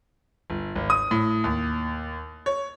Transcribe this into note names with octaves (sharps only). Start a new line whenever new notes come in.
G1
G#1
D#6
A2
D#2
C#5